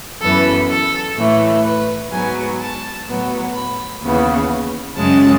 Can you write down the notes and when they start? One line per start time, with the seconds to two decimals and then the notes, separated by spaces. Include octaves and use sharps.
0.22 F#2 E3 B3 A4
0.69 A4
1.17 A2 E3 A3
1.64 B4
2.12 G#2 F#3 B3 G#5
2.60 A5
3.07 A2 F#3 B3
3.54 B5
4.02 D#2 C#3 E3 B3
4.97 F#2 C#3 G#3 C#4 A5